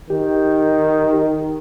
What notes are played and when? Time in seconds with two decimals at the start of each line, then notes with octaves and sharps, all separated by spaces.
0.10 D#3 G4